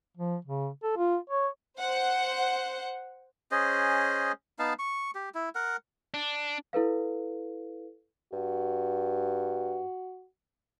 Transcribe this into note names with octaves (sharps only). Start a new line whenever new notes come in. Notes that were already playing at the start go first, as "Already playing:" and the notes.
F3
C#3
A4
F4
C#5
C5 F#5
C#4 G#4 C5 D#5
B3 D#4 F5 A5
C#6
G4
E4
A#4 F#5
D4
E4 A4 B4 F5
G2 F#4